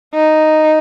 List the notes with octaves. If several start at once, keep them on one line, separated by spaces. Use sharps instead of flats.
D#4